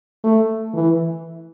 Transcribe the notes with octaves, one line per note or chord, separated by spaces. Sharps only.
A3
E3